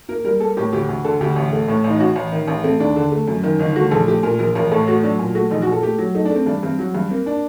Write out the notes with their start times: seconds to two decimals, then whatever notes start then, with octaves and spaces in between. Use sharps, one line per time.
0.09 A#3 A#4
0.24 G3 A#4
0.40 A#3 A4
0.57 A2 G4
0.73 D2 G4
0.89 D2
1.04 D3 A4
1.21 D2 G4
1.36 A1
1.52 A3
1.68 A2
1.84 A1
1.89 D#4
2.00 A1 F#4
2.16 A1
2.32 D#3
2.48 A1
2.64 A3 C4
2.80 D#2 D4
2.96 D3
3.12 A3
3.28 F#2
3.44 D#3
3.59 G1 D#4
3.76 A3 F#4
3.91 A#1 A4
4.07 A3 G4
4.23 A#2 A#4
4.39 A#1 A#4
4.55 A1 A#4
4.71 A2 A4
4.87 A3 F#4
5.03 F#3 D4
5.19 A#2
5.35 A3 F#4
5.51 A#1 D#4
5.62 F#4
5.67 A#2
5.72 A4
5.83 A3 G4
5.98 F#3
6.15 A3 D#4
6.25 D4
6.31 A3 C4
6.46 G2 D4
6.63 G2 C4
6.79 F#3
6.95 G2
7.10 A#3 C4
7.26 D4